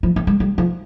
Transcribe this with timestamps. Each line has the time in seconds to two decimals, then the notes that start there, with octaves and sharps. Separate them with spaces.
0.03 F3
0.16 C4
0.27 G#3
0.40 G3
0.58 F3